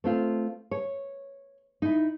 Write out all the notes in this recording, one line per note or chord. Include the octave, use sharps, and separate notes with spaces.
A3 C4 F4
C#5
D#4 E4